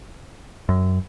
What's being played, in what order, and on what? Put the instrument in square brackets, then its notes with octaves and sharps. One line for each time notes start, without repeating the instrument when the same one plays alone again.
[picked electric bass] F#2